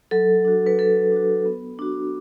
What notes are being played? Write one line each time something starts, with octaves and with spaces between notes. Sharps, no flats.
F#3 A4
D4 F#4
B4
F#3 A4
D4 F#4
B3
D4 F#4